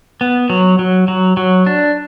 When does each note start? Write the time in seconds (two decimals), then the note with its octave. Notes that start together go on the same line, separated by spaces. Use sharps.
0.21 B3
0.50 F#3
0.79 F#3
1.08 F#3
1.37 F#3
1.66 D4